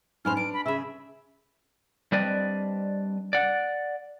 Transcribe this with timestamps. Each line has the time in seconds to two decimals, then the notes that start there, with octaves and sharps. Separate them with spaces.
0.25 F#2 A2 D#4 C5 G#5 B5 F6
0.37 D4 B4 D7
0.53 B5
0.66 C#3 G#4 E5 B5 E6
2.12 G3 C4 D4 B4 D5 D#5
3.33 D5 F#5